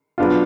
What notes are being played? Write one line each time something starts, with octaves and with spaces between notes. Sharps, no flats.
B2 F#3 B3 D4 F4